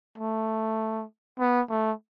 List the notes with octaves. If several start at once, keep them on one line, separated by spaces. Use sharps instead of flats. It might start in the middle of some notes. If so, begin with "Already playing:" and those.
A3
B3
A3